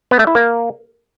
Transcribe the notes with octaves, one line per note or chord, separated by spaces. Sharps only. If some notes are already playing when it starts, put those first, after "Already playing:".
B3
A3
E4
A#3